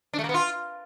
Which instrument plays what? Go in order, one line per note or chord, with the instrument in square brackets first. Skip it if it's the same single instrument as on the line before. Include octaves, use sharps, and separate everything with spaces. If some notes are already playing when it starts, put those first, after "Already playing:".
[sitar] D4
A3
A#3
B3
F4